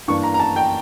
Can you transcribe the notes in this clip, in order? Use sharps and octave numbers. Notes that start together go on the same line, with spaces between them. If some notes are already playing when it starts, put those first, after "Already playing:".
G2 E3 A#3 D4 C#6
A#5
A#5
A5
G5